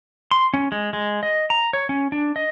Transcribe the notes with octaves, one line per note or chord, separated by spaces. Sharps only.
C6
C#4
G#3
G#3
D#5
A#5
C#5
C#4
D4
D#5